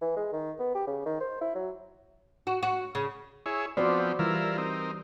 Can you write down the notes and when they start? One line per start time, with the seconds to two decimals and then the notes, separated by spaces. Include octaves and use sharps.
0.01 E3
0.16 G#3
0.32 D#3
0.59 B3
0.74 G4
0.87 C#3
1.06 D#3
1.20 C5
1.41 E4
1.55 F#3
2.47 F#4
2.63 F#4
2.95 C#3
3.46 E4 G#4 C#5
3.77 F3 B3 C4 F#4 C5 D5
4.19 E3 G3 E4 F4 A#4
4.58 C4 D#4 A#4